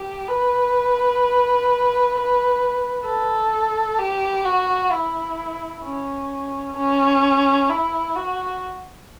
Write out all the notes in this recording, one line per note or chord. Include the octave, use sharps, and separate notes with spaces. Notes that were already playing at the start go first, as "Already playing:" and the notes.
Already playing: G4
B4
A4
G4
F#4
E4
C#4
C#4
E4
F#4